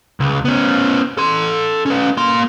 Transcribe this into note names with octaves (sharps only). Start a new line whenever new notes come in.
C#2
B3 C#4
A4 C6
C#4 B4
A#3 C6